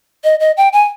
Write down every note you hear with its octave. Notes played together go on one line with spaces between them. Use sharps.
D#5
D#5
G5
G#5